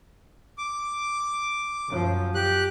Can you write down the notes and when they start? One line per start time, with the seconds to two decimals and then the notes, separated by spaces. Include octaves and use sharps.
0.58 D6
1.88 F#2 F3
2.35 G4 F#6